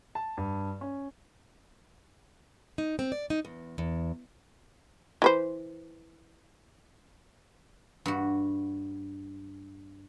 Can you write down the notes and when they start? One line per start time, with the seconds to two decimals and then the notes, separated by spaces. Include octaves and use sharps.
0.15 A5
0.37 G2
0.81 C#4
2.78 D#4
2.99 C4
3.12 D5
3.30 D#4
3.45 E2
3.78 E2
5.22 E3 B4 C5
8.06 G2 F#4